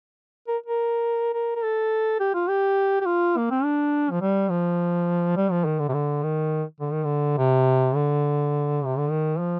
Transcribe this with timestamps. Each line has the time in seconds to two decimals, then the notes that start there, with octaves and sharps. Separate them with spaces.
0.47 A#4
0.66 A#4
1.34 A#4
1.56 A#4
1.63 A4
2.20 G4
2.34 F4
2.48 G4
3.01 G4
3.06 F4
3.37 A#3
3.51 C4
3.64 D4
4.10 F3
4.21 G3
4.50 F3
5.36 G3
5.51 F3
5.65 D#3
5.79 D3
5.88 C3
5.93 D3
6.23 D#3
6.80 D3
6.92 D#3
7.04 D3
7.37 C3
7.95 D3
8.85 C3
8.97 D3
9.10 D#3
9.39 F3